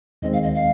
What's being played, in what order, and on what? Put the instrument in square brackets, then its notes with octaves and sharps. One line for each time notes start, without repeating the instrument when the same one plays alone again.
[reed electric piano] D#2 D#3 G#3 C4 [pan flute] D#5
[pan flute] F5
D#5
F5